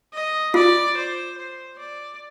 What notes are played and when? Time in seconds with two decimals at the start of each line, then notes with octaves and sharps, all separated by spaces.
0.13 D#5
0.54 F4 D5
0.97 C5
1.37 C5
1.79 D5